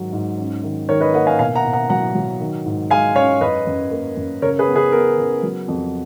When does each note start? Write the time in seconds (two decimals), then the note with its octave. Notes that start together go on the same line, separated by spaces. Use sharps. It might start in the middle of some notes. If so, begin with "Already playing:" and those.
Already playing: G#2 D#3 F#3
0.13 G#2
0.38 C#4
0.63 D#3
0.89 D#3 A#4 C#5
1.01 B4 D#5
1.14 A#3 D#5 F#5
1.27 F5 G#5
1.39 B2 F5 G#5
1.56 F#5 A#5
1.64 B2
1.73 F#5 A#5
1.89 F#3 F#5 A#5
2.15 F#3
2.40 D#3
2.66 G#2
2.91 G#3 F5 G#5
3.15 C#4 C#5 F5
3.41 F#2 B4 D#5
3.67 F#2
3.91 A#3
4.17 F#2
4.42 C#3 A#4 C#5
4.59 G#4 B4
4.68 B3
4.76 G#4 B4
4.92 B3 A#4
5.18 C#3
5.43 F#3
5.68 F2